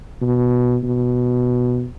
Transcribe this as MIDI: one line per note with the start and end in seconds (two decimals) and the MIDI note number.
0.21 0.77 47
0.83 1.86 47